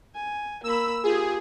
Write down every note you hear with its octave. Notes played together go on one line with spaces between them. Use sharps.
G#5
A#3 B5 E6
F4 G4 G#4